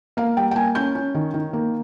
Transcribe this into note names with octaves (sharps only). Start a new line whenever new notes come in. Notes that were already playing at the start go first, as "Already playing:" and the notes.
A#3 F5
G3 G5
G5
A#3 G#5
C#4 G6
C#4
D#3
D#3
A#3